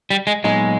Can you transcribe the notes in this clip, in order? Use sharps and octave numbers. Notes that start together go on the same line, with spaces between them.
G3
G#3
A#2 F#3 G#3 B3 D#4